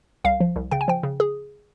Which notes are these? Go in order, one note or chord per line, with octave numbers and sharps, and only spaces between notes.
C2 F5
F3
C2
C#3 G5
G#5
F3 G5
C#3
G#4